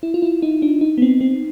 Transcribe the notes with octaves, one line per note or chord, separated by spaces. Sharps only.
E4
F4
E4
D#4
D4
D#4
B3
C4
C4